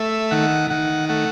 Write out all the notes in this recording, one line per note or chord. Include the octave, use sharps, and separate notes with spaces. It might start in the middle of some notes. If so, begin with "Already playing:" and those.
Already playing: A3 E5
D#3 F#5
D#3 F#5
A3 F#5